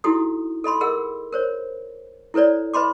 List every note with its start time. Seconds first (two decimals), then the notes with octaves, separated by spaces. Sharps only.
0.04 D#4 E4 F#4 G4 A4 D#6
0.64 A4 D#5 B5 C6
0.81 G#4 A#4 D#5 F#5 E6
1.33 A#4 C5 C#5
2.34 E4 A4 B4 C#5 D5
2.74 B4 D#5 B5 C6 D6